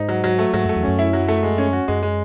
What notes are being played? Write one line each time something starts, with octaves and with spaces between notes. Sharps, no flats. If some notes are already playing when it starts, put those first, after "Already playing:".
Already playing: G#2 D#4
F#3
F#3
A3
G#2 F#3
F#2 A3
E2
F#2 C#4
E4
F#3
A3
G#3
C#4
F#4
F#2 G#3
G#3